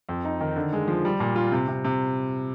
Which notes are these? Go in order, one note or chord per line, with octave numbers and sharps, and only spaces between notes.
F2
D#4
D#3
D3
G#3
F3
G3
A#2
F4
C3
C3
C3